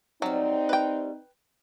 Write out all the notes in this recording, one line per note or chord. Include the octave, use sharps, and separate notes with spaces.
F#3 G3 A3 C4 D#4
B4 G5